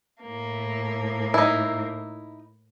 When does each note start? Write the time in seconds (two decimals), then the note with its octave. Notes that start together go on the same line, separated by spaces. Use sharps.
0.22 A2 A#3
1.34 D#4 E4